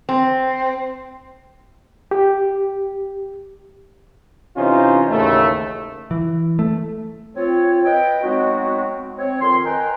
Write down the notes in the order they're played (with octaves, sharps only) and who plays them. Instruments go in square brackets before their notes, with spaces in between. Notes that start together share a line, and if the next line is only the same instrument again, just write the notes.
[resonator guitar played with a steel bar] C4
[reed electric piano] G4
[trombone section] C3 E3 C#4 D#4 F4 C5
A1 D#2 C#3 A3
[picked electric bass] E3
A3
[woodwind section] C4 F4 C#5
B4 D#5 G5
F#3 G#3 B3 C4 D#4 F#4
C4 C#5
F2 D#3 C4 C6
A#4 B4 D#5 G5 G#5 A#5